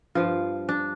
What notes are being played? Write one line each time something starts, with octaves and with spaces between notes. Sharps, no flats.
G2 F3 F4
D4